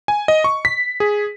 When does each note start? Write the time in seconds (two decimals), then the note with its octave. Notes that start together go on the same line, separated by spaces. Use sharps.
0.08 G#5
0.28 D#5
0.44 C#6
0.65 B6
1.00 G#4